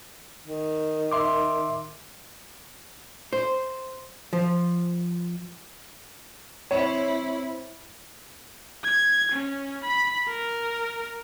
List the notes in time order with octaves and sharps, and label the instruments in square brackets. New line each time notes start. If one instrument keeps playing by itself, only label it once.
[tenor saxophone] D#3
[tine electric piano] E5 C6 D6
[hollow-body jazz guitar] C5
F3
[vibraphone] C4 C5 [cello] E4 [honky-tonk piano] C#5
[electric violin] G#6
C#4
B5
A#4